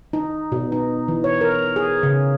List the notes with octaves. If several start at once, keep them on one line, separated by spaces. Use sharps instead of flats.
D#4
B2
D#4
E3
C#5
A#4
G#4
C#3